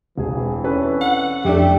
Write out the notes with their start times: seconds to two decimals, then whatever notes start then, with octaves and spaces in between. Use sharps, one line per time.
0.18 E1 E3 C4 D4 G#4
0.64 C#4 A4 B4
1.01 F#5
1.45 F2 A3 D4 G4